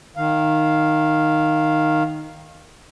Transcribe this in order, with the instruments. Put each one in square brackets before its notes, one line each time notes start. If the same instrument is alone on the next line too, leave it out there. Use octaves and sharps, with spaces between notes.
[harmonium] D#3 F5